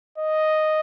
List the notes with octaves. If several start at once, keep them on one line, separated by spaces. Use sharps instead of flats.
D#5